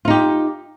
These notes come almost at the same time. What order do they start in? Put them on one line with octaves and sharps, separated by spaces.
F4 D#4 G4